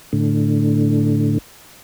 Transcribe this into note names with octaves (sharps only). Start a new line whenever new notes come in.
A2 D3